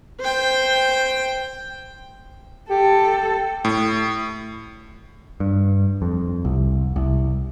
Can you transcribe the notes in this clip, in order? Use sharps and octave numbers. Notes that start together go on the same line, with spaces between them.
C5 G5
G4 A4 G5
A2
G2
F2
C2
C2